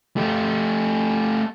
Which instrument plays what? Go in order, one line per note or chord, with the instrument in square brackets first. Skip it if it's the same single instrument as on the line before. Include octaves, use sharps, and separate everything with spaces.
[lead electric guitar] A3 G4